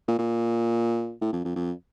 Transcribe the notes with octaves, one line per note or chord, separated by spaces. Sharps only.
A#2
A#2
A2
F2
F2
F2